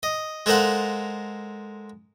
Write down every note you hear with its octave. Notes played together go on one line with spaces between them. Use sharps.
D#5
G#3 A4 A#4 C5 F5 F#5